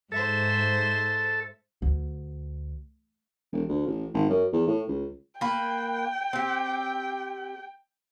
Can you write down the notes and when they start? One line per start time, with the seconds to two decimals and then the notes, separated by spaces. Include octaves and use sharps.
0.12 G#2 A4 C5 E5
1.82 D2
3.53 E1
3.68 D2
3.87 A1
4.14 G#1
4.30 F#2
4.53 E2
4.68 A2
4.88 C#2
5.41 A#3 B4 G5
6.33 C4 G4